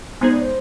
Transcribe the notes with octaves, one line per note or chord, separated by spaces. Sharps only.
G#3 B3 D#4 G#4 C5
D5
C5